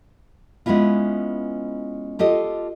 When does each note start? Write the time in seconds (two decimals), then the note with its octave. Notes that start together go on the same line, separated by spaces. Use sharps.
0.66 G#3 B3 C#4 E4 F4
2.19 F4 G4 A4 D#5